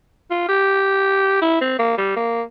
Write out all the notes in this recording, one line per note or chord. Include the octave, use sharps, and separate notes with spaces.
F4
G4
E4
C4
A#3
G3
A#3